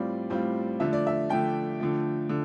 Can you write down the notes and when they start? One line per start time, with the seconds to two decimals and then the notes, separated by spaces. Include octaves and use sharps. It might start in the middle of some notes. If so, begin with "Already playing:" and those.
Already playing: A2 G3 C4 F4 D5
0.30 A2 G3 C4 F4
0.80 D3 F3 A3 E5
0.93 D5
1.07 E5
1.29 D3 F3 A3 G5
1.80 D3 F3 A3
2.29 D3